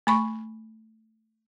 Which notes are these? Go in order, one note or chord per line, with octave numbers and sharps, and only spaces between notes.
A3 B5 C#6